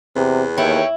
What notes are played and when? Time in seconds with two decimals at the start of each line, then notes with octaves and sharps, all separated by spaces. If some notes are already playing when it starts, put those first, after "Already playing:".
0.16 E2 C3
0.58 D#2 E4 C#5 G5